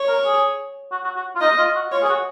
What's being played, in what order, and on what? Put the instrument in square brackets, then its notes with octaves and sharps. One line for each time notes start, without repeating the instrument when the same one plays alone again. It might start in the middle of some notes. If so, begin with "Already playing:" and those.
Already playing: [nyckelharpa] C#5
[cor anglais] A#4
G#4
F#4
F#4
F#4
F4
[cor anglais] D#4 [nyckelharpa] D#5
[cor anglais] F4
F#4
[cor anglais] F4 [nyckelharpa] C#5
[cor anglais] G#4
F#4